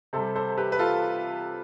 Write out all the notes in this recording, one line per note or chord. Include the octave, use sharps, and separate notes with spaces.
C3 G3 A4 C5
A4 C5
G4 B4
B4
F4 A4